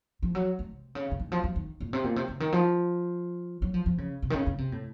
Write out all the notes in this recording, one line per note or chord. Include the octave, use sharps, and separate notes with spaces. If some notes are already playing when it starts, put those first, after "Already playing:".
F3
F#3
A3
C3
C#3
C#3
D#3
F3
F#3
D#3
A#2
C3
A#2
C3
C#3
D#3
F3
F#3
F3
F3
C#3
C3
D#3
C#3
C#3
C3
A2